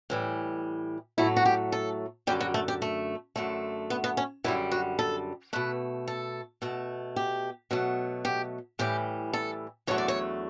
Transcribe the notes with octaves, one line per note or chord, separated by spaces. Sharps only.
A2 E3 G3
A2 F#3 A3 E4
F#4
G4
A4
F#2 D3 G3 G4
F#4
A3
G4
A3
F#2 D3 A3
B3
B3
C#4
F#2 D3 G3 E4
F#4
A4
B2 A3 B4
A4
B2 A3
G4
B2 F#3 A3
G4
A2 E3 G3 G4
A4
E2 D3 F#3 A3 C#5
D5
C#5